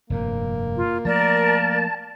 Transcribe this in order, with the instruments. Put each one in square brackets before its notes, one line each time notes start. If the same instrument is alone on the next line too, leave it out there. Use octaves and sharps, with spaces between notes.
[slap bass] F1 G2 A#2 [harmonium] A#3
[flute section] F4
[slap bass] F3 A3 [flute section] A#4 D5 [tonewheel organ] A5